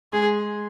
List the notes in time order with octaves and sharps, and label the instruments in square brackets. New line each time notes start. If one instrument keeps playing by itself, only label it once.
[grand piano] G#3 [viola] G#4